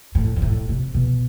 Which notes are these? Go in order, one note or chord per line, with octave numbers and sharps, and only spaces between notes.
A2
G2
A2
C3
B2